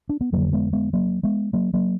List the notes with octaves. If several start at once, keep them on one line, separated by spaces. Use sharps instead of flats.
D4
B3
F2 D3 F#3 A#3
G#3 B3
G#3 B3
F#3 A#3
G#3 B3
F#3 A#3
F#3 A#3